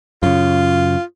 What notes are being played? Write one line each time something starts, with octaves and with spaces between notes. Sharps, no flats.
F#2 C#3 F4